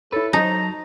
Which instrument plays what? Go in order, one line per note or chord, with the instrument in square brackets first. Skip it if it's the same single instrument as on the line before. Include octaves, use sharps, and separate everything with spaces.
[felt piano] E4 C#5 [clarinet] A4 [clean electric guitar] B4
[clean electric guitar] F#3 [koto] D#4 [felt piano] C5 D#5 A5 [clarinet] A#5